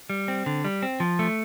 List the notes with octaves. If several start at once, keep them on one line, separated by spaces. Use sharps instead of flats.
G3
C4
D3
G3
C4
F3
A3